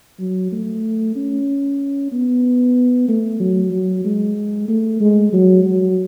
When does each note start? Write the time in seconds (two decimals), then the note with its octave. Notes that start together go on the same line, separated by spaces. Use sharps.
0.19 F#3
0.52 A3
1.16 C#4
2.12 B3
3.09 A3
3.40 F#3
3.72 F#3
4.04 G#3
4.68 A3
5.01 G#3
5.33 F#3
5.64 F#3